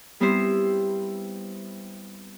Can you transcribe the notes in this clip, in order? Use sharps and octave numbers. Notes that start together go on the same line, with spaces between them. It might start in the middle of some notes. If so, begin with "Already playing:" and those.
G3 B3 C4 E4 G4 C5